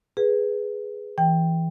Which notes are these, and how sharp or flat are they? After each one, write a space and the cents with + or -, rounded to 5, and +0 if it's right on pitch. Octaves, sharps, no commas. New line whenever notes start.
G#4 +0 B4 +0
E3 +0 G5 +0